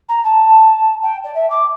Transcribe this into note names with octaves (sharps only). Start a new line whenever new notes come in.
A#5
A5
G5
D5
E5
D6